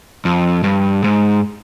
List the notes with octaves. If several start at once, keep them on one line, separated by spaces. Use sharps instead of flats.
F2
G2
G#2